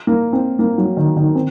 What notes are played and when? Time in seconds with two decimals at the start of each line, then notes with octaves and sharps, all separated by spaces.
0.07 A#3
0.33 C4
0.59 A#3
0.78 F#3
0.97 D#3
1.17 D#3
1.35 C4